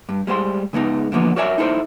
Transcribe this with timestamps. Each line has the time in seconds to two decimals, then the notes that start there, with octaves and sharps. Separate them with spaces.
0.09 G2
0.27 G3 G#3 C5 F5 C6
0.73 C#3 G#3 B3 D#4
1.12 D3 E3 F3 A#3 B3
1.36 F#4 A#4 C#5 D5 E5 G#5
1.58 D#4 E4 A4 C5 D5